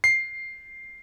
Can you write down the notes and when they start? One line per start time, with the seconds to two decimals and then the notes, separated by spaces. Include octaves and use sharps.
0.04 C7